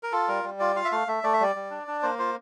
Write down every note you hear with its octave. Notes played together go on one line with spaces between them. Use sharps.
A#4
F4 A4
G3 A#4
G3
F4 D5
F4 F5
E5
A3 F5
A3 E5
A3 D5
E5
G3 D5
G3
D4
D4
A#3 C5
F4 C5